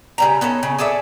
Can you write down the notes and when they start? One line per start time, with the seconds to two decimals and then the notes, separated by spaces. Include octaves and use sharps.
0.18 C#3 G3 A#5
0.41 B3 C#4 D#4 A4
0.63 C#3
0.79 G#4 A4 D5 E5